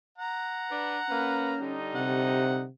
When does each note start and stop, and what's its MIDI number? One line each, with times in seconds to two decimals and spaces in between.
0.18 1.70 78
0.18 1.70 82
0.70 0.98 62
0.70 0.98 71
1.09 1.54 58
1.09 1.77 61
1.09 1.54 71
1.60 2.64 50
1.60 2.64 55
1.60 2.64 63
1.95 2.69 48
1.95 2.63 78